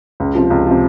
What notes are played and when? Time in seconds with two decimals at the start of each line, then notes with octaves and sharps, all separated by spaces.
0.20 C#2
0.35 C3 F3
0.50 C#2
0.67 C3 F3